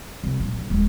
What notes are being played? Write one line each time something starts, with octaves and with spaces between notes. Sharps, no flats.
C2
A#2 F#3
G2
D#1 G#3